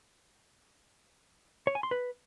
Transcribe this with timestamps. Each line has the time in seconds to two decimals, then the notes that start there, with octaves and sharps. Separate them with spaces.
1.67 C#5
1.75 G#5
1.83 C6
1.91 B4